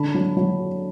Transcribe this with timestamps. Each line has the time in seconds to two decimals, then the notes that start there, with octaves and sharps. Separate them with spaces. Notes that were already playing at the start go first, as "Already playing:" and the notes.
Already playing: D3 D4 A5 B5
0.14 F#3
0.37 F#3